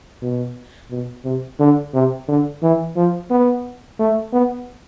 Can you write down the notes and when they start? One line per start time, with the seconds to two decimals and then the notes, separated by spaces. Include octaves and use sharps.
0.22 B2
0.90 B2
1.25 C3
1.59 D3
1.94 C3
2.28 D3
2.62 E3
2.96 F3
3.30 B3
3.99 A3
4.33 B3